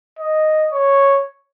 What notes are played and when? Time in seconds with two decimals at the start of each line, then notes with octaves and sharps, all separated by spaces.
0.19 D#5
0.72 C#5